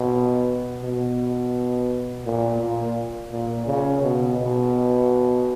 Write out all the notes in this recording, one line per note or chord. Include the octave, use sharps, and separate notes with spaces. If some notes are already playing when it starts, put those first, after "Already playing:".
Already playing: B2
B2
A#2
A#2
A#2
C#3
B2
B2